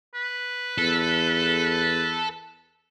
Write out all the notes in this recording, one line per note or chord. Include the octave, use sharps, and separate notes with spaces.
B4
E2 A4